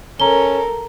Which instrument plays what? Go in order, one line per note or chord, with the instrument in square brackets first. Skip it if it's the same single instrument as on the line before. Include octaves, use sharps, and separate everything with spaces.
[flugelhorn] C#4 [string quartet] A4 A#4 [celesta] A#5 G7